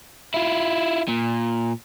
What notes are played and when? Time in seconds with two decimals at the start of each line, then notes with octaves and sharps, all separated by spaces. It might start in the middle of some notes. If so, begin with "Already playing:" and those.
0.34 E4 F4
1.08 A#2